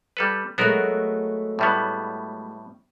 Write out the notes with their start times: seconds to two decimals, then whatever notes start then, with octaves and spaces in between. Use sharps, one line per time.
0.17 G3 A4 B4
0.58 F#3 G#3 A3 B3 F#4 A#4
1.59 A2 G3 B3